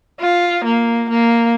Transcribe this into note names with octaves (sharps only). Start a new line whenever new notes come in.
F4
A#3
A#3